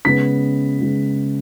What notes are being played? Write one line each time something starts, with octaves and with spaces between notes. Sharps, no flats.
C#3 G#3 B3 B6
C#3 G#3 B3